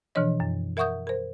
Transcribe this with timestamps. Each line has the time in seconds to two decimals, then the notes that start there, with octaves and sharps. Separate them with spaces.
0.15 B2 E3 F3 D4 C#5 D#5
0.40 F#2
0.77 A#4 E5 F#5 C#6 D#6 G6
1.07 A#4 C5